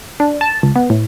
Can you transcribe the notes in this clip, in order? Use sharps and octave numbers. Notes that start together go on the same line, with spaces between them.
D4
A5
C#2
B3
A2